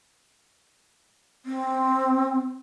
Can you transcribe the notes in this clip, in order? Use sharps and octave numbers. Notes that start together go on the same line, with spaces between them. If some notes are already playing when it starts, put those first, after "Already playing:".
C4